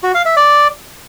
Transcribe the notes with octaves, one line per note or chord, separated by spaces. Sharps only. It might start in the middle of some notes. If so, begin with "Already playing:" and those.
F#4
F5
E5
D5